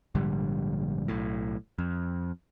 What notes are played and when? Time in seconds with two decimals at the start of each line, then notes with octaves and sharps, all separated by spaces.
0.15 A#1 G#2 D3 G3
1.08 B1 A2
1.79 F2